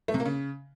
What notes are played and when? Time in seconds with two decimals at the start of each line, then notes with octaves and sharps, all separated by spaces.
0.08 A3
0.14 C3
0.20 A#3
0.26 C#3